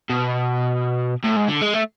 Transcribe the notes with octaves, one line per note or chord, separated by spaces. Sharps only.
B2
A2
G#2
D3
G#3
A3